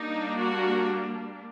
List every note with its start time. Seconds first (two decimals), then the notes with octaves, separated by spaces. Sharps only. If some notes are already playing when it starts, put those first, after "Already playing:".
Already playing: G3 A#3 D4 D#4
0.38 F#4